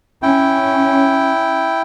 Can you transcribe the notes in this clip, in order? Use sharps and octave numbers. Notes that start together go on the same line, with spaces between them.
C#4 E4 G5